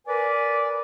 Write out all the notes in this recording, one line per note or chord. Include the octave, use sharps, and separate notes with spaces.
A#4 B4 D5 G#5